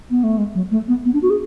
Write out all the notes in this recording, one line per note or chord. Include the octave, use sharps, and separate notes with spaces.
B3
A3
G#3
F#3
A3
B3
B3
D4
F#4
G#4